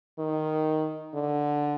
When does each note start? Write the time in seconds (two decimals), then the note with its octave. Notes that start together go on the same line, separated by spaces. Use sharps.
0.19 D#3
1.14 D3